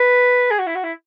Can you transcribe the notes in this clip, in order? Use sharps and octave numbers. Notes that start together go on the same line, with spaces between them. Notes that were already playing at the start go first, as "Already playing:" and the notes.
Already playing: B4
G#4
F#4
E4
F#4
E4